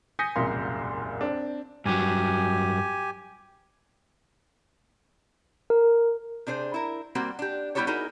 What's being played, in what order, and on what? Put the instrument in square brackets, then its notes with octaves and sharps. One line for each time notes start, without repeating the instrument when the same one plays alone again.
[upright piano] G#5 D#6 G6 A#6 B6 C#7
E1 C2 F#2 A#2 F5 C6
C4 D4
[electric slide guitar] G2 F#3 [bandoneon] G4 G#5
[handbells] A#4
[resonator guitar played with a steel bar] C3 D4 G#4 C5
E4 A#4
G3 A#3 C4 F#4
D4 G4
G3 B3 E4 G4 A4 C#5
D#4 E4 F#4 G#4 A#4